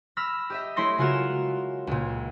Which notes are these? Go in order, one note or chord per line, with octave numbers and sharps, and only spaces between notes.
B5 E6 F6 A#6
G4 D#5 E5
A3 E4 C#5 C6 A#6
C#3 G#3 F4 F#4 A#4 E7
C#2 A#2